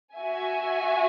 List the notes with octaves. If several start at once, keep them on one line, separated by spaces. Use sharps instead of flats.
F#4 E5 G#5